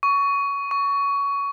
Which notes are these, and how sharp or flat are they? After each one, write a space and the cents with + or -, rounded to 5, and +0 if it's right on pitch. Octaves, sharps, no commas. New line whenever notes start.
C#6 +20
C#6 +20